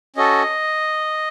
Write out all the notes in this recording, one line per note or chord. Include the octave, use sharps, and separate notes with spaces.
C#4 F#4 A4 D#5